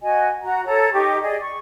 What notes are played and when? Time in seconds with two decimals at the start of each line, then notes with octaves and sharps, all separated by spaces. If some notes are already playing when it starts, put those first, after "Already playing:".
0.01 F#4 D#5 G#5
0.41 F#4 A#5
0.65 A4 C#5 A#5
0.93 D#4 G4 D#5 C#6
1.22 G#4 D5 D#5
1.41 C#6